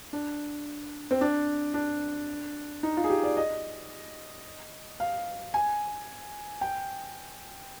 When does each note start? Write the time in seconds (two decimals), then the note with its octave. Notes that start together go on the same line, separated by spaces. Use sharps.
0.13 D4
1.11 C4
1.21 D4
1.74 D4
2.83 D#4
2.97 F4
3.04 G#4
3.10 G4
3.23 D5
3.37 D#5
5.00 F5
5.54 G#5
6.61 G5